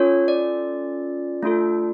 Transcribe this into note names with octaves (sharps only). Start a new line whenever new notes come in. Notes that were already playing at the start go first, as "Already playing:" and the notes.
Already playing: C#4 F4 A4 C#5
D5
A3 D4 F4 A4